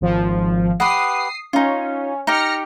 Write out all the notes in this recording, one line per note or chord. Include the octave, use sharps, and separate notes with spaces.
G#1 F3
G4 B4 F#5 D#6 C7
C#4 D#4 F4
D#4 G4 F6 A#6 C#7